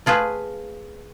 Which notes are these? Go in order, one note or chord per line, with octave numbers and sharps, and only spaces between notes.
A3 F4 G#4 B4